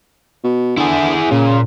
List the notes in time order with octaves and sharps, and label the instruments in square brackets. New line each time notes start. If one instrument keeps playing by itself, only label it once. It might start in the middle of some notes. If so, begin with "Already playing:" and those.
[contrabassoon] B2
[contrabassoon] D3 [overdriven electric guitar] E4 G#4
[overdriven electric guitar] A#2 [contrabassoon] C#3